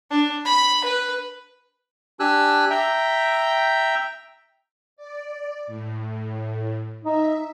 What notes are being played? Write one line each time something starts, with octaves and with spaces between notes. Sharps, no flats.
D4
B5
B4
D4 G4 G#5 E6 F#6
E5 G5 A#5
D5
A2
D#4 E5